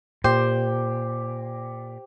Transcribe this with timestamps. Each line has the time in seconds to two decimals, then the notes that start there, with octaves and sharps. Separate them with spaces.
0.24 A#2 G4 C5